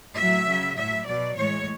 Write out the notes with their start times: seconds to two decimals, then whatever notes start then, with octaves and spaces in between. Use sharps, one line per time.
0.16 A2 F#3 E5
0.46 C#3 F#3
0.76 A2 F#3 E5
1.06 B2 F#3 D5
1.36 A2 E3 G#3 C#5